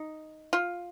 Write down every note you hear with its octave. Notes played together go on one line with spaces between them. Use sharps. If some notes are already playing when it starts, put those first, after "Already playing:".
Already playing: D#4
F4